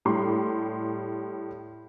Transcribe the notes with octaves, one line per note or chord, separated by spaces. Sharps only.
A2 G3 C6